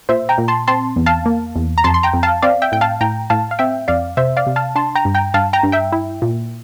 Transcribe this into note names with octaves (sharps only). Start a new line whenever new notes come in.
A#2 C5 E5
G5 A#5
A#2
A5 C6
C4 A5 C6
E2
F5 A5
A#3
E2
A#5
F2 A5 C6
C6
G5 A#5
F2
F5 A5
C4 D5 F5
E5 G5
A2 G5
F5 A5
A2 G5 A#5
A2 F5 A5
F5
C4 E5 G5
F2 D5 F5
C3 C5 E5
D5 F5
C3
F5 A5
D4 A5 C6
G5 A#5
G2
G5 A#5
G2 F5 A5
G5 A#5
G2
E5 G5
E4
A#2